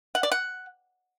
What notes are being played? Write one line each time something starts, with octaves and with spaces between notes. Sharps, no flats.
F#5
D5
F#5